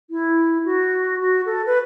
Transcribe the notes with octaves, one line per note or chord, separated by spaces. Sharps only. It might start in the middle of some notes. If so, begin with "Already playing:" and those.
E4
F#4
F#4
A4
B4